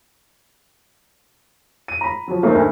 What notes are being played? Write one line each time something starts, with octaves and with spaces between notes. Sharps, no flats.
D#7
A#5 B5
F3 F#3
A3 A#3 C4 D#4 A4 C5
D2